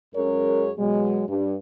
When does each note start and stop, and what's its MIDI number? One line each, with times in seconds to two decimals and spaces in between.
0.15 0.71 42
0.15 0.71 56
0.15 0.71 61
0.15 0.71 68
0.15 0.71 70
0.15 0.71 73
0.78 1.23 47
0.78 1.23 54
0.78 1.23 56
1.28 1.55 43